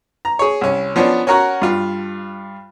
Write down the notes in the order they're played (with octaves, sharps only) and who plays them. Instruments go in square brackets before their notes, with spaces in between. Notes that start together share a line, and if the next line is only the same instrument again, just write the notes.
[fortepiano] A#5
G#4 C#5
C2 C#4
F3 B3 C#4 D4
C#4 F#4 A#4 C#5 F#5
G2 F4